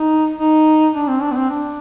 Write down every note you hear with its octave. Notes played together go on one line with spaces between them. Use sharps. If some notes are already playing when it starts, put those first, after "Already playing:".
Already playing: D#4
D#4
D4
C4
D4
B3
C4
D4